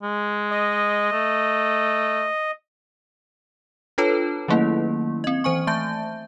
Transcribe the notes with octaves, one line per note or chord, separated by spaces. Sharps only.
G#3
D#5
A3
D4 F4 A4 B4 C#5 A5
D#3 F#3 A3 A#3 C#4 E4
C4 D#5
E3 C5 G#5 C#6
A3 E5 A5 G6